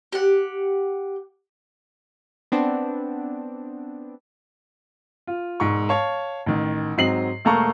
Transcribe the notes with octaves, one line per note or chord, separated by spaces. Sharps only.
G4 F#5
B3 C4 D4
F4
E1 G#2 C#6
C#5 F5 A5
A1 D#3
G#2 F#3 C4 D#5 C7 F#7
E1 A3 A#3 A5 A#5 C#6